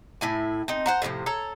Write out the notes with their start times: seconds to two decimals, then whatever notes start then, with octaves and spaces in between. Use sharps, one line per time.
0.21 A2 E4 G#5
0.68 C4 D#4
0.86 C5 F#5 A#5
1.02 A2 C3 E3 F3
1.26 A4 C#5 A#5